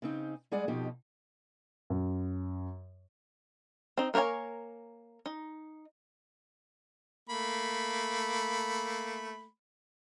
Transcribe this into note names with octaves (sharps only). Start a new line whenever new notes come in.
C#3 C4 D#4
G3 G#3 G#4 D5 F#5
F2 B2 F3 D#4 G4
F#2
C4 D#4
A#3 A#4 B4 C#5 G#5
D#4
A3 A#3 B5